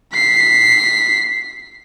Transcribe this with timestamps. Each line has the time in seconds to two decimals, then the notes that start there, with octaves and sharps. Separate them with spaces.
0.13 B6 C7